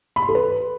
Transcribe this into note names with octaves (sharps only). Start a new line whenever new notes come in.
B5
C6
A4
B4